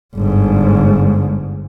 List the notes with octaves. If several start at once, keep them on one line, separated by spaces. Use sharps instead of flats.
G1 G#2